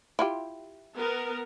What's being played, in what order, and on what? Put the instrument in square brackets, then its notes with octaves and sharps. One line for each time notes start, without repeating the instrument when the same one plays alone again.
[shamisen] E4 F4 G4
[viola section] B3 A#4